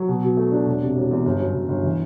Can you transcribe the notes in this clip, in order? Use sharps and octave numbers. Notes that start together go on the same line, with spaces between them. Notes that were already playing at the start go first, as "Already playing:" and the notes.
Already playing: F#3
B2
B2
A3
D4
E1
C3
E1
E2
G1
F#2
G1
G1
E3